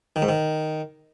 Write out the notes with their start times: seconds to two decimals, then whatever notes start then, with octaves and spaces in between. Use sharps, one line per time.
0.16 D#3
0.22 G#2
0.29 D#3